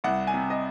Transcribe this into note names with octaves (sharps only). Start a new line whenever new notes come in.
C2 F#5
G#5
C3
D#5